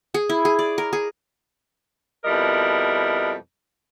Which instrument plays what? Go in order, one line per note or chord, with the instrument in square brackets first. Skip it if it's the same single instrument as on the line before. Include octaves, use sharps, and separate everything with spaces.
[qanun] G#4
E4
G#4
D5
A#4
G#4
[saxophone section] F2 B2 G3 E4 A#4 D#5